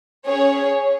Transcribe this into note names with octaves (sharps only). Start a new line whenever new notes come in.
C#4 G#4 C#5